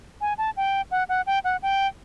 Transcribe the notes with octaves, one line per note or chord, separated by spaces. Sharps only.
G#5
A5
G5
F#5
F#5
G5
F#5
G5